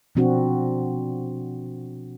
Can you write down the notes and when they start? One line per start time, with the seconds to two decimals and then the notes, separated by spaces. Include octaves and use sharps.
0.15 B2 F3 C4 D4 F#4